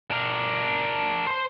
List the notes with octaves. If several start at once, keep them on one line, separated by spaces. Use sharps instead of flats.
D4 A#4
C5 C6